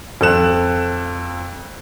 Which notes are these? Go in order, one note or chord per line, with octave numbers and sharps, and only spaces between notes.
F2 A4 F#6 E7